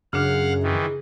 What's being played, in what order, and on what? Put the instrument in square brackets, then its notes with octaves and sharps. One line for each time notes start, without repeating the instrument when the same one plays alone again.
[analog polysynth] F#2 [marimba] C#3 D4 [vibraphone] G#4 [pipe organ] F5 F#5 F6
[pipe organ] D#3 E3